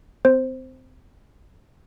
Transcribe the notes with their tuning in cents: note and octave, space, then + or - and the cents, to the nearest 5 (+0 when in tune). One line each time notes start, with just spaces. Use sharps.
C4 -30 C5 +0